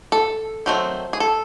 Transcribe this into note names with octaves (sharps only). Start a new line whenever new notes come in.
A4
D#3 F#3 A3 C4
G#4
A4